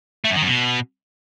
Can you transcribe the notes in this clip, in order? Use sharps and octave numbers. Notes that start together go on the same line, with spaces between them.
A3
F#2
D#3
F#2
B2